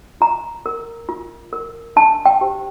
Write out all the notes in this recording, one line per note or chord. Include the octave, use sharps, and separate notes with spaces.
F4 A#5
A#4
F4
A#4
D4 A5
G5
G4 C5